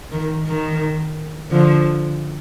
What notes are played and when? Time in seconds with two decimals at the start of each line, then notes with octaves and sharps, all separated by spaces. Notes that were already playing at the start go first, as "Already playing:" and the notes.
0.12 D#3
0.47 D#3
1.51 D3 F3